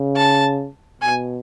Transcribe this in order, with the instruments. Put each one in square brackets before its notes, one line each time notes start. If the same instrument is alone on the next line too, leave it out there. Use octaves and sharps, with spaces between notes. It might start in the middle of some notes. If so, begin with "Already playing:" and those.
Already playing: [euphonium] C#3
[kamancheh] A5
[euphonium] B2 [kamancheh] G#5